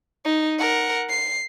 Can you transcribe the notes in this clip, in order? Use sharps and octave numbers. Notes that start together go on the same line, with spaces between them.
D#4
A#4 F#5
C7